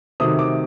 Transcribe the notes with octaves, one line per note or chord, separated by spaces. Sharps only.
C3 D#3 F#3 A3 D#6
D6